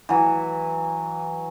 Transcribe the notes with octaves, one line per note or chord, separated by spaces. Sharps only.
E3 F#3